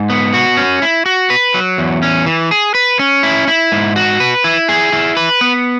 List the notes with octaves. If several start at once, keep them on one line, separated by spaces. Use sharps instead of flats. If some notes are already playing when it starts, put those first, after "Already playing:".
Already playing: G#2
B3
F#4
C#4
E4
F#4
B4
F#3
E2
C#4
E3
G#4
B4
C#4
E4
E4
G#2
F#4
B4
E4
G#4
E4
B4
B3